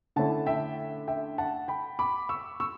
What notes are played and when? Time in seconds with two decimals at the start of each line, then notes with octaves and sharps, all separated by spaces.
0.16 D3 A3 C#4 E4 F#5 A5
0.46 E5 G5
1.08 E5 G5
1.38 F#5 A5
1.68 G5 B5
1.99 B5 D6
2.29 C#6 E6
2.60 C#6 E6